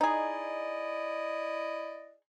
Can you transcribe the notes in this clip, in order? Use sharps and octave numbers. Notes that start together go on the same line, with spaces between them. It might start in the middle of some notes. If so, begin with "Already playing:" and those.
D#4 E4 G#4 D5 D#5